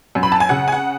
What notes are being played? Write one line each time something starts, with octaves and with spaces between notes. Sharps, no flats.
F#2
B5
A5
G#5
C#3 F#5
G#5
F#5